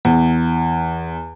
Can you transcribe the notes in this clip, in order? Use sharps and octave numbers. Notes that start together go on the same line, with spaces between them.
E2